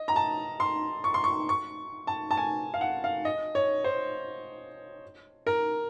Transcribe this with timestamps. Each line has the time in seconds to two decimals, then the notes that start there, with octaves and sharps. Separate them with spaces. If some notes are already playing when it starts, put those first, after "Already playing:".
Already playing: D#5
0.08 A#5
0.16 A5
0.60 C6
1.04 C#6
1.14 C6
1.24 C#6
1.49 C#6
2.07 A5
2.31 A5
2.37 G#5
2.74 F5
2.81 F#5
3.04 F5
3.25 D#5
3.55 C#5
3.84 C5
5.47 A#4